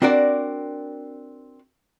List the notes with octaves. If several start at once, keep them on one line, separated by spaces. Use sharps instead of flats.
C4 D4 F#4 A#4 D5